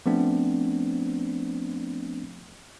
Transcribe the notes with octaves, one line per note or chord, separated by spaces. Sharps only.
F3 A3 B3 C4 D4